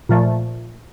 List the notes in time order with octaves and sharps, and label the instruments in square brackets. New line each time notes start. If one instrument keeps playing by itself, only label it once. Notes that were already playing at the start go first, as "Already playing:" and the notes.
[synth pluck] A#2 F3 A3